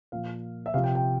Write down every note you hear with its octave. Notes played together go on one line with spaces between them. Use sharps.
A#2 F3 F5
E5
C3 F3 F5
G5
G5